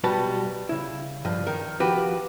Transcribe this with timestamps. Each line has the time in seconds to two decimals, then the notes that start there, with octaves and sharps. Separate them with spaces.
0.04 B1 G3 F#4 B4 A5
0.69 C#3 E4
1.25 G2 F3
1.47 D#3 A#4
1.80 F3 F#4 G4 B4